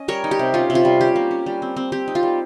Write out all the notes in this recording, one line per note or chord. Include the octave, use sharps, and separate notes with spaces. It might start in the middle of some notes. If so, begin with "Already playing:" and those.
Already playing: C#4 D#5
G3 A#4 C#5
D#4
G4
C3
C#4 F4
C3
F4
G3
C#4 G4
A#3
C#4
G3
C4
C4
C4 G4
D#4
F4
G3